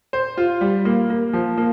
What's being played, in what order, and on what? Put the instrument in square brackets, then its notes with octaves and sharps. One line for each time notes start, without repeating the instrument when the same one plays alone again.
[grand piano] C5
F4
G3
A#3
A#3
F3
A#3